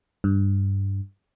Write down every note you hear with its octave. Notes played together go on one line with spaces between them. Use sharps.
G2